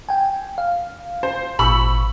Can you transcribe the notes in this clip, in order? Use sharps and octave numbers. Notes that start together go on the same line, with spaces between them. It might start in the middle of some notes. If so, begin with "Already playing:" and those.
G5 G#5
F5
C5
G#1 A#2 B5 C#6 E6